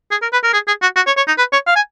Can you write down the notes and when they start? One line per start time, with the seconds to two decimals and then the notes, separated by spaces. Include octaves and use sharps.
0.11 G#4
0.22 A#4
0.33 B4
0.43 A#4
0.54 G#4
0.68 G#4
0.82 F#4
0.96 F#4
1.07 C#5
1.17 C#5
1.27 D#4
1.38 B4
1.53 C#5
1.67 F5
1.76 G#5